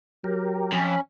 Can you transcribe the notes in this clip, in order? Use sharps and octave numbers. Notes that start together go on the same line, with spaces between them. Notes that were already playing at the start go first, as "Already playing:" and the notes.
F#3 G4 A#4
F2 C#4 B5